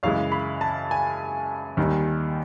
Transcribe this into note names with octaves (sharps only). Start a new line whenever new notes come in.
F#2 C#3 E3 G#3 F5
B5
A5
G#5
D#2 D#3 G3